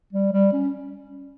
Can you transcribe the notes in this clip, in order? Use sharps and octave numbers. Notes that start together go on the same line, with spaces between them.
G3
G3
C#4